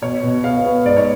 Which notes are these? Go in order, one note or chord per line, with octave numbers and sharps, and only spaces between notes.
B2 C#5
B2
B3 F5
B3
G#2 D5
C#5